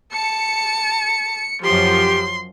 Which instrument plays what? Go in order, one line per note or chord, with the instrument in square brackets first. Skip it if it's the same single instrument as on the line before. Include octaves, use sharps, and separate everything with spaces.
[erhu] A5 [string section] C#7
[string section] F#2 F3 [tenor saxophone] G4 [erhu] C6